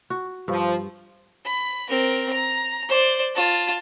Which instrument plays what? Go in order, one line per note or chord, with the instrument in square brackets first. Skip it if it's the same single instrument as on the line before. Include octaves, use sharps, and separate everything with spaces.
[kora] F#4
[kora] G2 [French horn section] F3
[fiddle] B5
C4 A#4
A#5
C5 D5
F4 A5